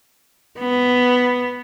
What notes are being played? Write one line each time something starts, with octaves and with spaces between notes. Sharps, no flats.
B3